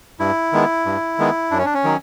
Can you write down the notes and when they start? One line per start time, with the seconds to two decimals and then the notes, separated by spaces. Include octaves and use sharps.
0.20 G2 E4
0.53 D#3 G#3 B3
0.86 G2
1.18 D#3 G#3 B3
1.51 F#2 D4
1.59 C#4
1.65 D4
1.74 C#4
1.84 D#3 F#3